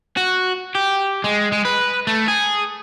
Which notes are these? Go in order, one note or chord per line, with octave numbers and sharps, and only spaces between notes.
F#4
G4
G#3
G#3
B4
A3
G#4